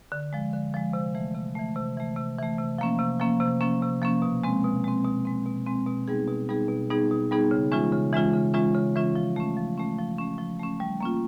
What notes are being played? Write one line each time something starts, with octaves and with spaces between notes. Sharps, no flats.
D3
F3 G#3
D3
F3 G#3
C3
E3 A3
C3
E3 A3
C3
E3 A3
C3
E3 A3
C3
F3 A#3 C#4
C3
F3 A#3 C#4
C3
F3 A#3 C#4
C3
F3 A#3 C#4
B2
G#3 C4
B2
G#3 C4
B2
G#3 C4
B2
G#3 C4
B2
G3 B3 D#4 G#4
B2
G3 B3 D#4 G#4
B2
G3 B3 D#4 G#4
B2
G3 B3 D#4 G#4
C#3
E3 G#3 C#4 F4
C#3
E3 G#3 C#4 F4
C#3
E3 G#3 C#4 F4
C#3
E3 G#3 C#4 F4
F3
A3 C#4
F3
A3 C#4
F3
A3 C#4
F3
A3 C#4
G3
A#3 C#4 F4